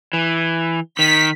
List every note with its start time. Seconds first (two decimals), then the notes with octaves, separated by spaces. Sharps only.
0.13 E3
0.99 D#3 B6